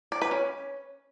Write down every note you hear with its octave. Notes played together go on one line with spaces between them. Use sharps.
D5
B4
C#4